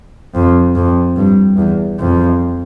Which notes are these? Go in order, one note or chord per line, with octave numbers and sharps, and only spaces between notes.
F2
F2
G2
E2
F2